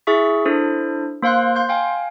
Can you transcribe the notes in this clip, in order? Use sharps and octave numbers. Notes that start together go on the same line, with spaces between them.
E4 G#4 E5 C#6 B6
D4 E4 A4 C5
A#3 C5 F5 C6 F#6
C6 G6
F5 G5 G#5